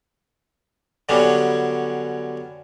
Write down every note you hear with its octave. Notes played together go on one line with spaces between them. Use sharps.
D3 F#3 G3 B3 C#4 D4